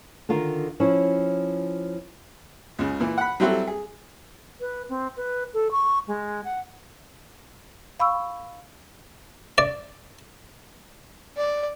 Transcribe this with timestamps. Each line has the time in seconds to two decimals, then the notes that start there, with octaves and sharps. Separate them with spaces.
0.29 D3 D#3 F4 A#4
0.80 F3 C#4 E4
2.79 C#2 C#3
3.00 A#2 E3
3.18 F#5 B5
3.40 F#3 G3 C4 E4 F#4 A4
3.67 G#4
4.61 B4
4.89 C4
5.17 B4
5.54 A4
5.72 C#6
6.08 G#3
6.44 F#5
8.00 F5 B5 C#6 E6
9.58 D5
11.37 D5